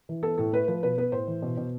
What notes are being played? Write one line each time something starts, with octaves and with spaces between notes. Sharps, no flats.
E3
B3 A4
A2 A4
A3 B4
F3 B4
B2 B4
B3 B4
A2 C5
E3
B2
B2